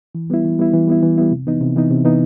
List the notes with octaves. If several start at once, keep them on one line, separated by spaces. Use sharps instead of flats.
E3
G3 B3 E4
E3
G3 B3 E4
E3
G3 B3 E4
E3
G3 B3 E4
C3
E3 B3 D#4
C3
E3 B3 D#4
C3
E3 B3 D#4